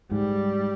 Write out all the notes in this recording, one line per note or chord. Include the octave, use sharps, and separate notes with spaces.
G#2 G3